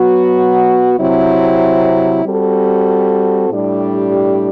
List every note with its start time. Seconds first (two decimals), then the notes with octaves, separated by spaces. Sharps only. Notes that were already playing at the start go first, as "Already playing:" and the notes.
Already playing: F#3 B3 F#4
0.98 C3 F#3 C4 E4
2.25 G3 C4 F#4 A4
3.50 A2 G3 D4 G4